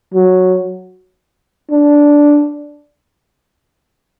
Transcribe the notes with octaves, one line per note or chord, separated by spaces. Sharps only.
F#3
D4